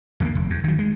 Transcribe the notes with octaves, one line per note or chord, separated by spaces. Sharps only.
E2 D3 A#3
F1
E2
D#3 F#3
G#3